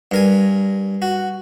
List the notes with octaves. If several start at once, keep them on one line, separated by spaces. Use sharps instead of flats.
G2 A#4 G#5
F#4